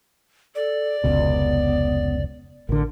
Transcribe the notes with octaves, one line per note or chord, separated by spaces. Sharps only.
A4 D5
F1 C#2 B2 B3
A1 D3 A#4